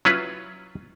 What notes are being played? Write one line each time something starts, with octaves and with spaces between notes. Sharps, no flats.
F#3 C#4 E4 F4 B4